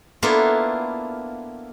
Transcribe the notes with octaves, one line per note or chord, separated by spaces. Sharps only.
A#3 B3 D4 E4 F4 A4